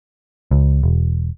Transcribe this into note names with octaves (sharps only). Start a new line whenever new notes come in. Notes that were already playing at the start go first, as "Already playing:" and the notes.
C#2
E1